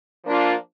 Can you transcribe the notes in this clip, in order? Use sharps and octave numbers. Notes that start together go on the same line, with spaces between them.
F3 A#3 D4 F4